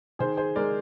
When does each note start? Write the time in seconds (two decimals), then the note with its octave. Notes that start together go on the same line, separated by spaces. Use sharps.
0.19 D#3 G#4 C5
0.37 G#4 C5
0.56 G#3 A#4 D5